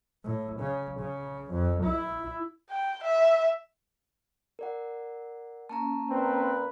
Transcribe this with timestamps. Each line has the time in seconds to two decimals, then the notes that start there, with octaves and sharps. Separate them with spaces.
0.24 A2
0.60 C#3
1.00 C#3
1.51 F2
1.83 E4
2.70 G5
3.03 E5
4.59 A#4 D5 F#5
5.69 A#3 C#4 A5 A#5
6.10 A#2 C4 B4